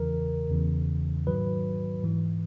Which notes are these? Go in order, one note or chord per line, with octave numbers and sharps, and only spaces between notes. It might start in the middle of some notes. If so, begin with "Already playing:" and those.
Already playing: E2 C#3 E3 A#4
E2 C#3 E3
G#2 D#3 F#3 B4
G#2 E3